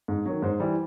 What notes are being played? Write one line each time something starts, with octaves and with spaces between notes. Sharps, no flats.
G#2
D#3 F#3
G#2 C5
E3 G3